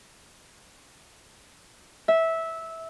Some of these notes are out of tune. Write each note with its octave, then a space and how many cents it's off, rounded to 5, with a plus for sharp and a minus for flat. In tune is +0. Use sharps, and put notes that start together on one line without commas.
E5 -15